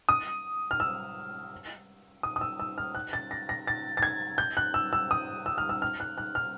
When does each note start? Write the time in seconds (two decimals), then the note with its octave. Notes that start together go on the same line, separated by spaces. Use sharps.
0.09 D#6
0.71 F6
0.80 E6
2.23 D#6
2.36 D#6
2.41 E6
2.60 E6
2.78 F6
2.95 F#6
3.13 A6
3.31 A#6
3.49 A#6
3.67 A6
3.97 A6
4.03 G#6
4.38 G6
4.57 F#6
4.74 E6
4.93 E6
5.11 D#6
5.46 E6
5.58 F6
5.69 E6
5.82 F6
6.00 F#6
6.18 F#6
6.35 F6